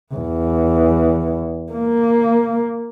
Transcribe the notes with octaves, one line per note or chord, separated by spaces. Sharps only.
E2
A#3